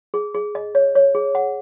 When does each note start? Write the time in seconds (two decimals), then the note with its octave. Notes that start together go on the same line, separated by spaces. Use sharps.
0.14 G#4
0.35 G#4
0.55 D#5
0.75 C#5
0.95 C#5
1.15 G#4
1.35 F#5